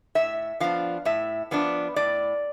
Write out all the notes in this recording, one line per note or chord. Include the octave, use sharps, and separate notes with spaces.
A2 E5
F3 B3 D4 F5
A2 E5
F3 B3 D4
A2 D5